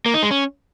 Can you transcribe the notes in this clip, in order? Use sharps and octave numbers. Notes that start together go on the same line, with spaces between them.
A#3
D#4
G#3
C#4